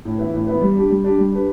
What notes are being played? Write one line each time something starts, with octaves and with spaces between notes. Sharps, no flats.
A2
E3 B3 E4 B4
A2
E3 B3 E4 B4
G3
D4 G4
G3
D4 G4
G3
D4 G4 B4